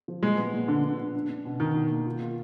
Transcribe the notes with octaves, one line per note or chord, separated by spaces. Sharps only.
F3
A#2 G#3
B3
A#2
D3 D4
D4
D4
D4
D4
B2
B2 D#3
B2
A#3
F4
F4